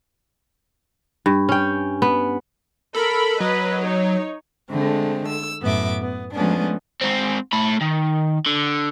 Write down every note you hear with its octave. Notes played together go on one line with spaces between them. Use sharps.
G2
C#4 G5
B3
A4 A#4 B5
F#3 B4 D#5
D#4 C#5
D3 G#3 A3 C4
E6
F#2 A2 B3 E5 D6
B3
F3 G#3 A3 B3 C#4 D4
G#2 C4
A3 B5
D#3
D3